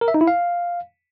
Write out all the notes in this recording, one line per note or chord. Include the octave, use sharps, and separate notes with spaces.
A#4
E5
D#4
E4
F5